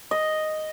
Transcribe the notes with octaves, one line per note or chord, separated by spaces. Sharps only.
D#5